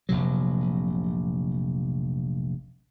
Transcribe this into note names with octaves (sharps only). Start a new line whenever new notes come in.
F1 A#1 C3 F#3